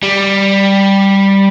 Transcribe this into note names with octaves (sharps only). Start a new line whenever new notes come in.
G3